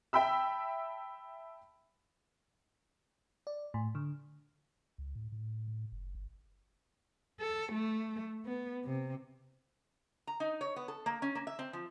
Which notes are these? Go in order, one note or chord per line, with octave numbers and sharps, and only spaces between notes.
E5 G5 A5 B5 E6
D5
A2
D3
C#2
A2
A2
A2
F#1
G1
A4
A3
B3
C3
A#5
D#4
C#5
B3
A4
A#3
C#4
A#3
E5
C4
F3